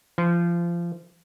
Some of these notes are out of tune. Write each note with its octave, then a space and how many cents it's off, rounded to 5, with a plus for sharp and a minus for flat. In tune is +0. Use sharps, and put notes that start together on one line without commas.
F3 -25